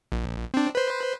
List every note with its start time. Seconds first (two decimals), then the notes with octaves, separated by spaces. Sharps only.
0.12 A#1
0.54 C4 D4
0.75 B4 C5